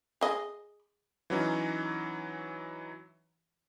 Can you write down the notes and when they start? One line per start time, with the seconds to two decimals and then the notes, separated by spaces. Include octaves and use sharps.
0.21 G#4 D#5
1.30 E3 F#3 C#4 D#4